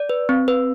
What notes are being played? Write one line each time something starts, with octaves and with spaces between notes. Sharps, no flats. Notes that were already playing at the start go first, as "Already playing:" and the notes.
Already playing: D5
B4
C4
B4